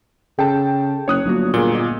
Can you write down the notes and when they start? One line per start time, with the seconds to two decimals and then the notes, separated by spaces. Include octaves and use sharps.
0.39 C#3 G#4 A4 G5 A5
1.08 F#1 C#5 D#6 F#6
1.26 G1 F#3 A#3 F#4
1.54 A#2 G#4 G7
1.74 A#3 B3 D#5